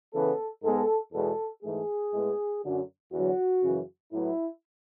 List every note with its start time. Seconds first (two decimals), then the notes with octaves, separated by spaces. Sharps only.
0.14 C#3 E3 B3 A4
0.63 G#2 G#3 B3 A4
1.13 E2 B2 G#3 B3 A4
1.63 G#2 E3 A3 G#4
2.14 A2 G#3 B3
2.63 F#2 D3 F#3
3.12 E2 D3 F#3 F#4
3.63 F#2 C#3 E3
4.12 A2 F#3 B3 E4